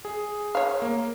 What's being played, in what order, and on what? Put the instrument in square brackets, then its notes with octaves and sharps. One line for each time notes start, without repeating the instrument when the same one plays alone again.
[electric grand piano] G#4
[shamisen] C#5 F5
[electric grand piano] A#3